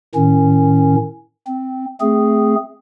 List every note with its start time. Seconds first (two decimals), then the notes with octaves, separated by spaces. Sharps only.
0.15 A2 D#3 C#4
1.47 C4
2.00 A3 C4 G#4